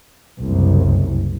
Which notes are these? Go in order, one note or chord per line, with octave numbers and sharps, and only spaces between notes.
F#1 C2